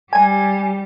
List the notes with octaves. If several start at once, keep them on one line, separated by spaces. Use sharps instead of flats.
G3 G4 G#5